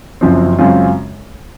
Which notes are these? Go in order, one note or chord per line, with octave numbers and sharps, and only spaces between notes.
F#1 F#2 C#3 F3 C4
F#2 C#3 G#3 C4 F4